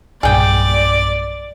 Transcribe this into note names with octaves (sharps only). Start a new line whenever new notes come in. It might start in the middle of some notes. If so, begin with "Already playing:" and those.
B1 G2 A#2 G#4 D5 G5